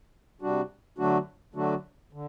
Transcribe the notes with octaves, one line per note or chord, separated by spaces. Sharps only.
C3 G3 D4 F#4
D3 F#3 A3 D4 F#4
D3 F#3 A3 D4 F#4
D3